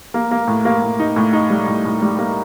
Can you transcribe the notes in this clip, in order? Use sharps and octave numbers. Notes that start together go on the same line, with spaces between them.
A#3
A#3
A2
A#3
A2
D#4
A2
D#4
G3
A2
A2
G3
A#3